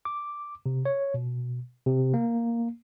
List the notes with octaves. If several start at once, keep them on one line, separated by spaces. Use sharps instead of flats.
D6
C3
C#5
B2
C3
A#3